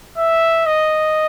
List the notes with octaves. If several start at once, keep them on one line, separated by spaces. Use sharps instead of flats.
E5
D#5